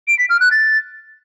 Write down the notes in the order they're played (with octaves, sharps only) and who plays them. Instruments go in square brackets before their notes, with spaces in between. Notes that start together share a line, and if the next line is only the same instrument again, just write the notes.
[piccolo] D7
B6
F6
F#6
A6